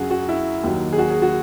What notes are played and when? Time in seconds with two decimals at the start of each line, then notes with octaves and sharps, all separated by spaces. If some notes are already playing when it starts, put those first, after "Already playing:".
Already playing: F#2 C#3 F#3 F#4 G#4
0.10 F#4
0.29 E4
0.63 D#2 D#3 F#3
0.93 G#4
0.99 F#4
1.10 G#4
1.22 F#4